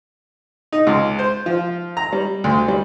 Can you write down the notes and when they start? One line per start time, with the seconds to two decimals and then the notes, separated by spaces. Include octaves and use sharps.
0.72 D#4
0.87 C#2
1.19 C5
1.46 F3
1.97 A#5
2.13 G3
2.44 D2
2.68 G3